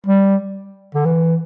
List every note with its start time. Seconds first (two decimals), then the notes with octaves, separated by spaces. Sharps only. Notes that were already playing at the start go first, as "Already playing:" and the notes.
0.06 G3
0.95 D3
1.05 E3